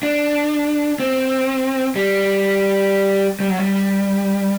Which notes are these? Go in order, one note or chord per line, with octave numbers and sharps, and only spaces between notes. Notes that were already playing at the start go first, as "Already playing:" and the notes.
D4
C4
G3
G3
F#3
G3